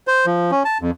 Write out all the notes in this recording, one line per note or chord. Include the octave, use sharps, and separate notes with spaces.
C5
F3
C#4
A5
F2